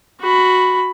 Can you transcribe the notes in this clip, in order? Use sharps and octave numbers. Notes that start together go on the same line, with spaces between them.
F#4 B5